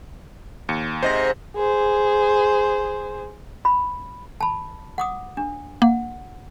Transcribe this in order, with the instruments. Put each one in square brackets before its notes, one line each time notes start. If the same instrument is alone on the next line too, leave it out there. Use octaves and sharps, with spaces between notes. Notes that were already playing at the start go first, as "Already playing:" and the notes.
[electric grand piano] D#2 C#7
[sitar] G#2 C3 [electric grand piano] C5 D#5 A#6
[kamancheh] G#4 C5
[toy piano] B5
A5 B5
F#5 D6 D#6
D4
[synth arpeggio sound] A#3 [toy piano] F#5